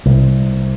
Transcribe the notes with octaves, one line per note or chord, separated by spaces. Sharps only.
C2